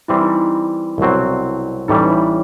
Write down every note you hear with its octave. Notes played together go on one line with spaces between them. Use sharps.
E3 G3 C4 E4
D#4
E4
C2 B2 F#3 C4
A1 A2 E3 G3 D#4
E4